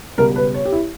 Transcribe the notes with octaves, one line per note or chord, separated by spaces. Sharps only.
C#2 B2 G3 A#4
B4
C#5
G4
E4